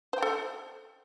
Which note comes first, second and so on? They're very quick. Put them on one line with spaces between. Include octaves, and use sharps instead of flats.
C5 G5 A4